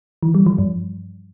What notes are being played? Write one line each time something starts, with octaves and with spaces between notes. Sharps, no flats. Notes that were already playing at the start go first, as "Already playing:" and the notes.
E3
G3
F3
G2